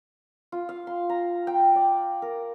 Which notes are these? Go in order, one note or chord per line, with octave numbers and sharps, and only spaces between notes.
F4
F5
C6
A#5
G5
D5
A#4